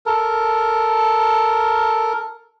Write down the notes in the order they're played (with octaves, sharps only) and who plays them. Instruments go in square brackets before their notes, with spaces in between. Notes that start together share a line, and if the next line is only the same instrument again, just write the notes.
[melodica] A4 A#4